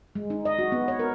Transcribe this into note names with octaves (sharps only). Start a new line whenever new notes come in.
G#3
D#4
D#5
F#4
B3
C#5
A#4